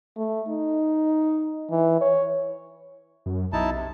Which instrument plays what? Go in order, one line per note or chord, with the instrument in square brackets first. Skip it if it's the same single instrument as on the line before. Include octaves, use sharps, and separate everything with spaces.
[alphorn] A3
D#4
E3
C#5
[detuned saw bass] F#2
[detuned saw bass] B1 [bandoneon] D#4 E4 A5
[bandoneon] C3